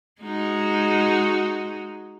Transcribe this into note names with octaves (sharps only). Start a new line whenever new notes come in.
G#3 D#4 F#4